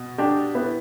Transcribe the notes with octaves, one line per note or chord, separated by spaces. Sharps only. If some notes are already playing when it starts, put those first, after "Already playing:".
Already playing: B2
D4 G4
B3 E4